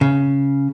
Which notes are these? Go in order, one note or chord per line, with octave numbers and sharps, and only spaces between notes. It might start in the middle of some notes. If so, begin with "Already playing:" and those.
C#3